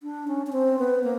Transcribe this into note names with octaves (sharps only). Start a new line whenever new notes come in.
D4
C#4
C#4
C4
B3
A#3